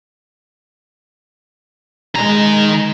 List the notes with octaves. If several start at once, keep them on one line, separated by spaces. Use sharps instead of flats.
D#3 G#3 A#5